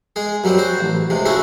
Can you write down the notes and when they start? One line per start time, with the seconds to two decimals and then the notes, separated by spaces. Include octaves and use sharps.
0.16 G#3 G#4
0.44 F#2 F#3 G3 C4
0.58 F#4 C5
0.81 A1
1.10 C#2 C3 G#3
1.26 A3 C#4 E4 F#4 G#4